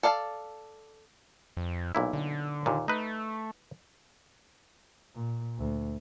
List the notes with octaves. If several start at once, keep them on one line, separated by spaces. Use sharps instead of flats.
A4 D5 F5 G#5 A5
F2
B1 A#2 E4
D3
D#2 A#2
A3 D#4 B4
A#2
D2